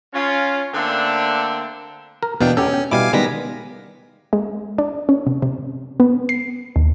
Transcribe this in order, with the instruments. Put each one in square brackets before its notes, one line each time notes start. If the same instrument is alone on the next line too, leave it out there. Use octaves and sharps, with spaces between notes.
[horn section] C#4 F4
D3 A3 A#3 C4 D4
[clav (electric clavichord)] A#4
[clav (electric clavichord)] E2 B2 F5 [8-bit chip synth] B3 D4 G5
[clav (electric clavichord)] B3 G4 A4 [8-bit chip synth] C#4
[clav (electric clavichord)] G5
[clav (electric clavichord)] B2 G3 E4 [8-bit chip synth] F5 G#5 D6
[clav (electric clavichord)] D#3 G3 G#3 [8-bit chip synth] B3 A#6 B6
[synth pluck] G#3
D4
C#4
C3
C3
B3
C7
D#2